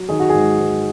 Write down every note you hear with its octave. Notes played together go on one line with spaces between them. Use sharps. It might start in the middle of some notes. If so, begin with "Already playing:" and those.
Already playing: F#3
D#3 G#4
F#4
G#2 G#4
G#2